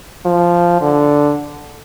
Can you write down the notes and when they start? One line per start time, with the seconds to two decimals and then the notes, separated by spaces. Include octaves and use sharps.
0.25 F3
0.81 D3